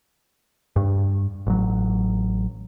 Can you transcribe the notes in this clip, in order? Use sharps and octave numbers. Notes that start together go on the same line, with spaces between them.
G2
A1 F#3